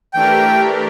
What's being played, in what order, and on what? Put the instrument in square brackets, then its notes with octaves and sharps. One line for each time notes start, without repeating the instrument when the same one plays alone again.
[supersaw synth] E3 A3 D4 G4 A#4 [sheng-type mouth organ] G5